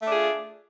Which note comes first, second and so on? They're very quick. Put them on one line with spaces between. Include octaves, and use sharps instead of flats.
A3 D4 G#4 F4